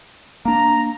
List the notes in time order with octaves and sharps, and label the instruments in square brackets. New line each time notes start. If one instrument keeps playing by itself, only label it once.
[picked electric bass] A#3 D4 [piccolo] A#5